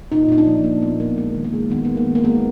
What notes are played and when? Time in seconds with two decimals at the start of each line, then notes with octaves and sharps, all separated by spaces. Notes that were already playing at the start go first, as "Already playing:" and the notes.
0.12 A#2 D#4
0.29 A#2 D#4
0.38 D4
0.46 F3
0.64 A#3
0.82 A#2 B3
1.00 A#2 A#3
1.18 G#3 A#3
1.35 D#3
1.45 A#3
1.53 G#3
1.71 D#3 B3
1.85 G#3 B3
1.97 A#3
2.07 D#3
2.15 A#3
2.24 G#3 B3